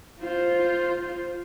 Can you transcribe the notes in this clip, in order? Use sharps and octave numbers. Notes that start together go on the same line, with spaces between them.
F4 C5